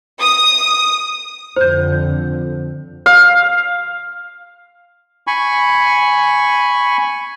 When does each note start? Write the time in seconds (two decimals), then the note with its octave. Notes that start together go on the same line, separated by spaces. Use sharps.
0.22 D#6
1.56 F2 D3 C5 G6
3.06 F5
5.27 G#5 B5 C#6